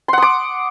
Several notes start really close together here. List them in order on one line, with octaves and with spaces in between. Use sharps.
C6 F#5 D#6 D6